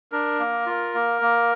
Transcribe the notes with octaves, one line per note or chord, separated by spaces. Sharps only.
D4 A#4
A#3
F4
A#3
A#3